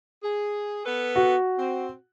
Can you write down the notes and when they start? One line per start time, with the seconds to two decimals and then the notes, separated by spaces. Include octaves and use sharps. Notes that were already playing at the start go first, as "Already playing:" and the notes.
0.24 G#4
0.86 B3 A4 B4
1.16 F#4
1.58 C4